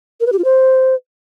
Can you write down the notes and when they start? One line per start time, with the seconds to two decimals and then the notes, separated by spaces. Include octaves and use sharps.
0.21 A#4
0.27 B4
0.33 G4
0.39 F4
0.44 C5